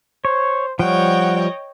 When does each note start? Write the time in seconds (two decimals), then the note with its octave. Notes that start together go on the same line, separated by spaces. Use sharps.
0.25 C5 C#5
0.79 F3 G3 C#5 D#5 F#5 G5